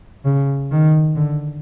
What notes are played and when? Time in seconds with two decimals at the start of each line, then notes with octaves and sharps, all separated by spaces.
0.25 C#3
0.71 D#3
1.16 D3